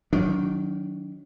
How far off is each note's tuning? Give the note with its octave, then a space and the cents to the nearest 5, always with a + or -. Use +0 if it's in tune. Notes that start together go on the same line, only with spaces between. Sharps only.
D#3 +0 F#3 +0 D4 -40